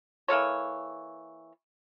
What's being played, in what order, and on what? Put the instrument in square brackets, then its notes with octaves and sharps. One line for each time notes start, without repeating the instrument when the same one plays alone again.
[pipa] E3 A#3 A4 C#5